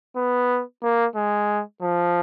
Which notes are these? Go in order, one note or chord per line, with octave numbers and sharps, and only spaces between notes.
B3
A#3
G#3
F3